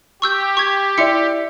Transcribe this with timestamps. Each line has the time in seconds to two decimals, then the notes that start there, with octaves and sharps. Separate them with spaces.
0.22 G4 C#6 E6 G6
0.57 C#6 G#6
0.98 E4 D5 E5 C6 C#7